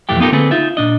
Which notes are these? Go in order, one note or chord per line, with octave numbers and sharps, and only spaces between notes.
B1 F2 E3 A3 G4 G5
B3 D#4 F4 G4 A4 A#4
D3 A#3 C4 G#4 A4 B4
D#4 F4 E5
A#2 D4 D#5